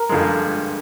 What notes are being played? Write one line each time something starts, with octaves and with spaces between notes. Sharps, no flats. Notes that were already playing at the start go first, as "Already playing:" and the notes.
Already playing: A#4
G2 D3 F3 G#3